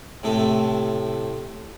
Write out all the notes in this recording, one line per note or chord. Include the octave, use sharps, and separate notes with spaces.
A2 C3 A4